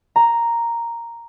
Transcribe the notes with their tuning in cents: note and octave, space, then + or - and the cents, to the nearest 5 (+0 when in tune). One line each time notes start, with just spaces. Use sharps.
A#5 +0